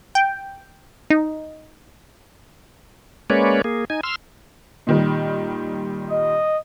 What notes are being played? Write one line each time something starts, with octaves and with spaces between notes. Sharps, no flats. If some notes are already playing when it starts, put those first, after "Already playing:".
G5
D#4
G#3 A#3 C#4 B4 C#5 D5
A#3 G#4
D#4 G#5
C6 E6 F6
A#2 D#3 G3
D#5